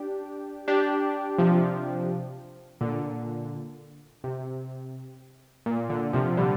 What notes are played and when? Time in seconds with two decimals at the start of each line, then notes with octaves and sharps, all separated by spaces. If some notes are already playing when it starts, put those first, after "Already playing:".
Already playing: D4 G4
0.68 D4 G4
1.38 C3 F3
2.81 A#2 D3
4.24 C3
5.66 A#2
5.90 A#2 D3
6.13 C3 F3
6.37 D3 G3